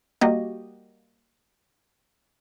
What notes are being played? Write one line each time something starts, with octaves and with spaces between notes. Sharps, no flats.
G3 A#3 F#4 G4 D#5